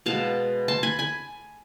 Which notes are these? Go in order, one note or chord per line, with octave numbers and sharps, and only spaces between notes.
B2 G#3 B3 F5 A5
A5 C6
G#5 B5
G#5 B5